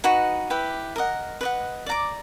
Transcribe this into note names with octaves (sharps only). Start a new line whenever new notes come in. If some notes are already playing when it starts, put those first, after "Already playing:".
D#4 F#4 B4 D#5
E4 G4 B4
A#4 D#5 F#5
B4 D#5 F#5
D5 F#5 A#5 D6